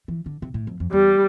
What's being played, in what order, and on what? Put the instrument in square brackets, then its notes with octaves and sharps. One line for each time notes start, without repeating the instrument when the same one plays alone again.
[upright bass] E3
D3
C3
A2
F2
F2
[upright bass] E2 [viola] G3